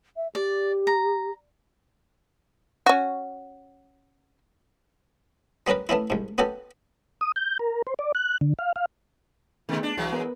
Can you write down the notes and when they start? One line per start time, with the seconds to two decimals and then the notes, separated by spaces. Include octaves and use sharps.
0.16 E5
0.35 G4 D5
0.87 A#5
2.86 C#4 F#4
5.67 G3 B3 C#4 A#4 B4
5.89 A3 B3 C#4 E4
6.10 C2 G#2
6.38 B3 C#4 F#4 G4 A4
7.21 D#6
7.36 G6
7.59 A#4
7.87 C5
7.99 D5
8.15 F#6
8.41 D3
8.59 F5
8.76 F5
9.69 C3 D#3 A3 B3 G#4
9.83 D4
9.97 C2 E3 F#3 G#3
10.13 B3 A#4 B4